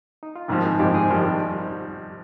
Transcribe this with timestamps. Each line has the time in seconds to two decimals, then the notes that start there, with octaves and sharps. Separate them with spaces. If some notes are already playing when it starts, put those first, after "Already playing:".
0.23 D#4
0.36 F4
0.48 G#1 G#2 F3 G3 G4
0.64 G#3 G#4
0.79 G#1 G#2 F3 G3 G4
0.94 G#3 G#4
1.10 G#1 G#2 F3 G3 G4